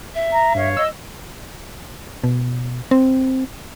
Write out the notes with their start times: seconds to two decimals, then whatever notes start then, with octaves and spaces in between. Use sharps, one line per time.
0.15 E5
0.31 A#5
0.55 G2 C#5 F5
0.77 D#5 E6
2.24 B2
2.91 C4